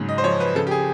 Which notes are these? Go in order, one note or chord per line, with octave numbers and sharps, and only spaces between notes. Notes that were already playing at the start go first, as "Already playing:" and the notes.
Already playing: G#2 C#3 F#3
D#5
C5
F3 C#5
B4
C#3 A4
G4
G#4